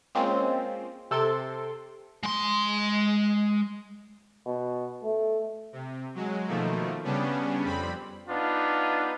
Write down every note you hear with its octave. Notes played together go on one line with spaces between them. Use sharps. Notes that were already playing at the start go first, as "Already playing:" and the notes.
G#3 A#3 C4 C#4 F4
C3 A4 C6 D7
G#3 C6
B2
A3
C3
F#3 G#3
B2 D#3 F3 A3 A#3
C#3 G3 B3 C#4 D4
F2 G3 C4 B5
B3 D4 D#4 F4